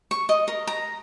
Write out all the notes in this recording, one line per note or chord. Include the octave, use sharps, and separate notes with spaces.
C#6
D#5
A#4
A#5